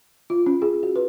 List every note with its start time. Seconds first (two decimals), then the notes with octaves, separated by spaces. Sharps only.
0.30 F4
0.46 C#4
0.62 G#4
0.83 F#4
0.96 B4